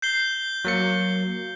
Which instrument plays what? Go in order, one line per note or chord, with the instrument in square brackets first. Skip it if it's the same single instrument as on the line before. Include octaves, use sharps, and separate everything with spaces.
[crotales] G6 C7 G7
[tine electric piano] F#3 A#3 C#7